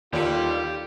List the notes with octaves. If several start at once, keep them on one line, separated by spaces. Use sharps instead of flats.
D#2 D3 G3 D4 F4 G4